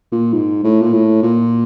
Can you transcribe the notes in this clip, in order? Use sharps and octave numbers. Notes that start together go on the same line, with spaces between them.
A#2
G#2
A2
A#2
A2
A#2